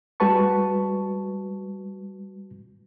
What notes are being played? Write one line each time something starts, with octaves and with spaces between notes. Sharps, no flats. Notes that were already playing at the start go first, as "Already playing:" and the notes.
G3 G#3 F#4 B4 A5 C#6